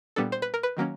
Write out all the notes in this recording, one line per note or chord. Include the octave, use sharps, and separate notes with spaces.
A#2 G3 B3 D4 A4
C5
B4
A#4
B4
D#3 F#3 A#3 C#4